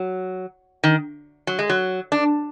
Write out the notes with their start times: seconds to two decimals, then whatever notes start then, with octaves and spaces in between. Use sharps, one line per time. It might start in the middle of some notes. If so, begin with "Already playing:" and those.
Already playing: F#3
0.84 D#3
1.47 F#3
1.59 G#3
1.70 F#3
2.12 D4